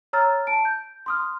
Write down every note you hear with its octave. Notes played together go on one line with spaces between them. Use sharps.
C#5 A#5 E6 F6 A6
A5 D7
G6
C6 D#6 F6